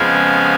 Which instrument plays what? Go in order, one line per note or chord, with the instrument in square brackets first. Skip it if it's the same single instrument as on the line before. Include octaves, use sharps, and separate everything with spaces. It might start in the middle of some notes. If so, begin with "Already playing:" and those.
Already playing: [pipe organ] F2 C#3 F3 G#3 B3 F5 G#5